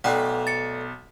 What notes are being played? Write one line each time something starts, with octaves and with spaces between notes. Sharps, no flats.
B1 A3 B3 D5 F#5 G5 F#6
A6 C#7